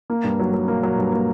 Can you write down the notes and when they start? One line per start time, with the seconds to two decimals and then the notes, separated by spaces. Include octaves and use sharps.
0.10 A#3
0.24 G2
0.39 F#3
0.54 F#3
0.68 A#3
0.83 F#3
0.98 G2
1.13 A#3